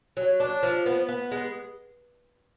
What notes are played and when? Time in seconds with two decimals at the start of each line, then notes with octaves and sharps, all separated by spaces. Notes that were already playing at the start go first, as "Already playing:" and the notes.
0.17 F#3
0.40 D4
0.63 F3
0.86 B3
1.09 B3
1.31 G#3